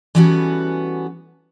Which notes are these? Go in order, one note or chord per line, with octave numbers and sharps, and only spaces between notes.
E3 G3 B3 C#4 F#4 A4